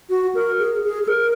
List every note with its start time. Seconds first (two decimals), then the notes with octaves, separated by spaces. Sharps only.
0.10 F#4
0.35 A#4
0.59 G#4
0.84 G#4
1.03 G#4
1.08 A#4